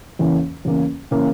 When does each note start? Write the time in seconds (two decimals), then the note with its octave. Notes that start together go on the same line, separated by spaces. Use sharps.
0.19 E2 C#3 E3 A#3 C#4
0.65 E2 C#3 E3 A#3 C#4
1.11 C#3 E3 A#3 C#4